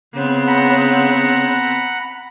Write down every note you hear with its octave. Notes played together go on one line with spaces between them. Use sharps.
C#3 B3 C4
F#5 A#5 B5